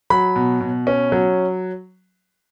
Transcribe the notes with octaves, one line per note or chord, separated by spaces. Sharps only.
F#3 B5
B2
B2
C#4
F#3